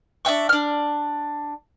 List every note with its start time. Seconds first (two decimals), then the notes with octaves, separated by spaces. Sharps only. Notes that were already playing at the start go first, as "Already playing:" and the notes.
0.25 D4 E5 G5 C#6
0.49 D4 F6